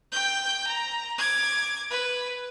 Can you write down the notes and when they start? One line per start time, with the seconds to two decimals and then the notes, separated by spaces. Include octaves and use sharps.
0.12 G5 G6
0.67 A#5
1.18 D6 G#6
1.91 B4